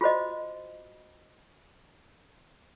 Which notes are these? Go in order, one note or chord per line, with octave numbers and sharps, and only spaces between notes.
F4 F#4 C5 D#5